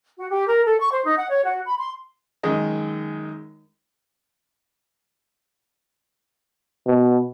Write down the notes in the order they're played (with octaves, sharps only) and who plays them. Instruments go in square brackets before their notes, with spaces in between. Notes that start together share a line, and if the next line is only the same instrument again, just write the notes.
[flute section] F#4
G4
A#4
A4
C#6
C5
D#4
F#5
C#5
F#4
B5
C6
[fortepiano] F#2 D#3 G#3 D#5
[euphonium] B2